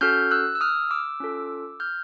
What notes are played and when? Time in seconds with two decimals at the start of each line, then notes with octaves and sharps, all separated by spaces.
0.01 C#4 F#4 A4 F6 G6
0.31 E6 F#6
0.55 E6
0.61 D#6 F6
0.91 D6 E6
1.20 C#4 F4 A4
1.80 F6 G6